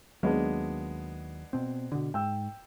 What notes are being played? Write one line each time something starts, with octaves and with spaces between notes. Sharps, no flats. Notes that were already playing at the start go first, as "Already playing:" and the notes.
D#2 F#3 G#3 A#3 B3 D4
B2 C4
B2 D3
G#2 G5 E6